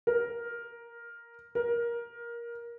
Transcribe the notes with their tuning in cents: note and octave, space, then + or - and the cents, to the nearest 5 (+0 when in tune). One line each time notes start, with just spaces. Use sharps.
A#4 +5
A#4 +15